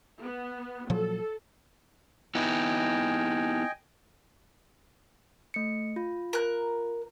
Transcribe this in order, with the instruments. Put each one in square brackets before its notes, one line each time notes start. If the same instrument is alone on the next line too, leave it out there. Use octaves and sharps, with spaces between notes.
[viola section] B3
[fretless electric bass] A#2 F3 F#3 [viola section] A4
[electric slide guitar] B3 D#4 E4 [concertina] D#5 G5 G#5
[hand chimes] A3 C#7
F4
[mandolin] A#4 F#6